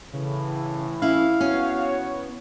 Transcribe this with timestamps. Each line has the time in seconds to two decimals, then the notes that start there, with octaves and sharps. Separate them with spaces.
0.13 A2 C#3 E3
1.02 C#4 E4 F5
1.40 B3 C#4 F#4 C#5